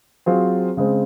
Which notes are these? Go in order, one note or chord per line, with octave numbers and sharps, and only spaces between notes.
F#3 C4 F4 G#4 C5
C#3 G#3 C4